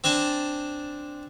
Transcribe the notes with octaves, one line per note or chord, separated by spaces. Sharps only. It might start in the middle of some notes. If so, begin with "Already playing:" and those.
C4 D4 G#5 A5